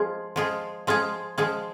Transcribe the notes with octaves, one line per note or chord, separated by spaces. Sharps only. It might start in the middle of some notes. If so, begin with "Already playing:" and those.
Already playing: F3 G#3 F4 G#4
F3 G#3 F4 G#4
F3 G#3 F4 G#4
F3 G#3 F4 G#4